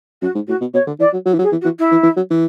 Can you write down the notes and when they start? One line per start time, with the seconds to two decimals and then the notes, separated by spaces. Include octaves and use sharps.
0.22 F#2 F#4
0.35 G#2
0.47 A2 F#4
0.61 B2
0.74 B2 C#5
0.87 D3
1.00 E3 D5
1.13 F#3
1.26 F#3
1.34 E3
1.39 F#3
1.43 G#4
1.52 E3
1.61 F#4
1.65 E3
1.78 E4
1.91 E3
2.03 E3
2.17 F#3
2.31 E3